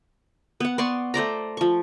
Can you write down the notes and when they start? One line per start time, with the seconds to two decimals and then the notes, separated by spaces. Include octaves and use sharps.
0.60 B3 F#5
0.78 B3 D5 C6 C#6
1.14 A3 C5 D5 A#5
1.57 F3 C#6